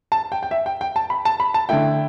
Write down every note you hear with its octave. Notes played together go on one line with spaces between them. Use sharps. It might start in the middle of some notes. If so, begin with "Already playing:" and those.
A5
G5
G5
E5
G5
G5
A5
B5
A5
B5
A5
D3 A3 E4 G5